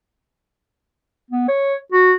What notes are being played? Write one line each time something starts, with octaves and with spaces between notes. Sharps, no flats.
B3
C#5
F#4